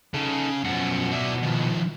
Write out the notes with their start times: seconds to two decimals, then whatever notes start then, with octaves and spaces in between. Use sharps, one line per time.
0.14 C#3 D#4 A4
0.64 F#2 B2 F3 F#5
1.12 E4 D5
1.43 D#3 F3